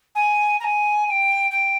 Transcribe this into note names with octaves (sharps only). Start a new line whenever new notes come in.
G#5
A#5
G#5
G#5
G5
G5